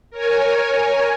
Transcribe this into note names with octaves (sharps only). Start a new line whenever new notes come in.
A#4 C#5 G#5